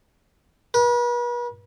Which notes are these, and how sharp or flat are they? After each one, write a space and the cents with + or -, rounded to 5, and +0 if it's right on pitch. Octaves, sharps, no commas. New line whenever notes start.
B4 -40